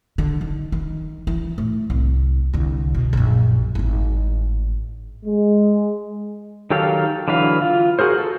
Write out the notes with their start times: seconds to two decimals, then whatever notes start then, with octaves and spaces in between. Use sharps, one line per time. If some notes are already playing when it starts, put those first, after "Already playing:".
0.18 D3
0.41 D#3
0.72 D#3
1.27 E3
1.58 A2
1.90 C2
2.54 C2 D3
2.95 B2
3.13 A#1 F#2
3.75 G#1 A2
5.25 G#3
6.70 D#3 F#3 G4 A4 F5
7.28 D3 E3 F#3 B4 F5
7.62 F4
7.99 F#4 G#4 A#4 C5
8.18 A4